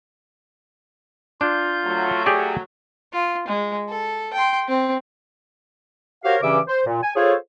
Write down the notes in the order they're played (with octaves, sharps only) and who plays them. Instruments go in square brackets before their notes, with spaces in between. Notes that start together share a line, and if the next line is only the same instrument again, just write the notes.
[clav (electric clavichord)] D4 [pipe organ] F4 G6
[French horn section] F#3 A3
[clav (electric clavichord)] G4 G#4 D5
[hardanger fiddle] F4
G#3
A4
G5 C6
C4
[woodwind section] F#4 G4 A#4 C5 C#5 F5
G2 C#3 E3 C#4 E5 D6
C5
A#2
G#5
F4 G#4 A4 C5 C#5